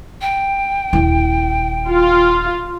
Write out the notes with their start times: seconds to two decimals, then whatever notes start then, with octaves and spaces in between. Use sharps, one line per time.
0.21 G5
0.93 D#1 E4
1.88 F4